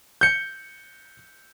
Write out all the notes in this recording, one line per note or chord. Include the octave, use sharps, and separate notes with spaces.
G6 C#7